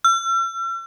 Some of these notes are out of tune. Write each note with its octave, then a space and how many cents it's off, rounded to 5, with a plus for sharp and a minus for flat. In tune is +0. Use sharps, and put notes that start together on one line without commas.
E6 +45